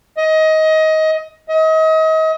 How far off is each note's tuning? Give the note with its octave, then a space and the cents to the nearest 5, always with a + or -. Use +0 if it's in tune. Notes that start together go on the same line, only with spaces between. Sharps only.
D#5 +20
D#5 +35